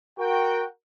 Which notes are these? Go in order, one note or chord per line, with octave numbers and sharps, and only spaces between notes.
F#4 A#4 G5